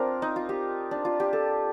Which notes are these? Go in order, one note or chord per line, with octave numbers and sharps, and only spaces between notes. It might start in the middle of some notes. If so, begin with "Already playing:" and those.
Already playing: C4 D4 F4 A#4
D#4
F4
G4
D4
F4
G4
A4